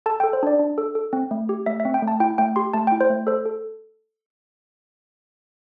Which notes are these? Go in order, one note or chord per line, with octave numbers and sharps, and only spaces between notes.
A4 A5
G5
A4
C5
D4 D5
D4
A4
A4
C4
A3
G4
A3 E5
E5
C4
G5
A3
A5
E4 G5
A3 G5
G4 C6
A3 A5
G5
E4
C5
A3
A4 C5
A4